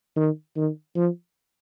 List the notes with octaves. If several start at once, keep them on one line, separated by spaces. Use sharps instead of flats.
D#3
D#3
F3